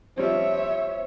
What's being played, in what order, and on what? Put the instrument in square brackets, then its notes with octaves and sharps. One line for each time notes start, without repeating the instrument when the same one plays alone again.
[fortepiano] F3 G3 C4 [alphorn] C5 [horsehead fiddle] C#5 E5